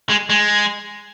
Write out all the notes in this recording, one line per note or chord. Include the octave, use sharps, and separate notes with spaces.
G#3
G#3